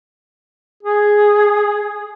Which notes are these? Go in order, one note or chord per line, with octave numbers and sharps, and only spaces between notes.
G#4